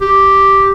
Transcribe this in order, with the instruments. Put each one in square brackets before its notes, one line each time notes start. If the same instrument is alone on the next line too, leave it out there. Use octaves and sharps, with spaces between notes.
[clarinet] G4